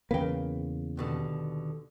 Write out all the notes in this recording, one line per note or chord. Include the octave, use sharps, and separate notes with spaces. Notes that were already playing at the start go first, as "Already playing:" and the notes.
E2 C#3 A#3 B4 G5
D#2 B2 D3